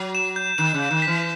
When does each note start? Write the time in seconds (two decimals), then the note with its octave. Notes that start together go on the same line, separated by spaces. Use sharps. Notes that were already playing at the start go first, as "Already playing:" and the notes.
Already playing: F#3
0.15 E7
0.36 G6
0.58 D#3 E7
0.74 C#3
0.80 G6
0.91 D#3
1.02 B6
1.07 E3